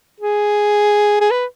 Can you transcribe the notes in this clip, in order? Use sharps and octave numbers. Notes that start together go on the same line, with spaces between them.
G#4
G#4
B4